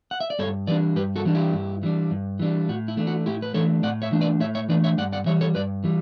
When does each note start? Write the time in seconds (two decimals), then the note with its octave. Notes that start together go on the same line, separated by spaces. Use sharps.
0.11 F#5
0.20 E5
0.30 D5
0.39 G2 A4 C#5
0.67 E3 G3 D4 B4 D5
0.96 G2 G4 B4
1.16 F#4 A4
1.25 E3 G3 D4
1.35 E4 G4
1.54 G2
1.83 E3 G3 D4
2.11 G2
2.39 E3 G3 D4
2.69 A2 F#4
2.88 E4
2.97 E3 A3 D4
3.07 F#4
3.26 A2 E4 G4
3.42 B4
3.54 E3 A3 D4 A4 C#5
3.83 A2 D5 F#5
4.02 C#5 E5
4.12 E3 A3 D4
4.21 B4 D5
4.40 A2 C#5 E5
4.55 C#5 E5
4.69 E3 A3 D4 B4 D5
4.84 C#5 E5
4.98 G2 D5 F#5
5.13 D5 F#5
5.26 E3 G3 C#5 E5
5.41 A4 C#5
5.55 G2 B4 D5
5.84 E3 G3